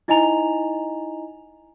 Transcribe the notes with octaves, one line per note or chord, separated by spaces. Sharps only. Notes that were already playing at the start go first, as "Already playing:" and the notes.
D#4 E4 D#5 G#5 A#5 F7